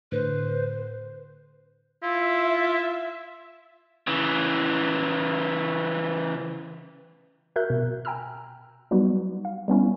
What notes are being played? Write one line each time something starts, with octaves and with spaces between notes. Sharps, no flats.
A2 D3 B4 C5
E4 F4 E5
C#3 E3
F#4 A#4 E5 F#6 G6
B2
G5 G#5 A#5 B5 E6 F6
F#3 G3 B3 D#4 F#4 B4
F5
G3 B3 C#4 E4